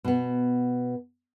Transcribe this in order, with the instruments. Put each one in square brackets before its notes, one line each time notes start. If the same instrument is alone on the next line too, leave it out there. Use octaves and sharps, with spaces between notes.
[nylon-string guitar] B2 B3